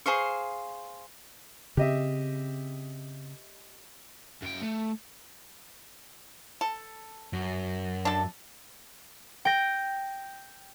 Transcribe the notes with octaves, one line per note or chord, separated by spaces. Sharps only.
G#4 C5 F5 C#6
C#3 C4 G4 D#5 E5
F#2 G5
A3
A4
F#2
D4 A4
G5 A#6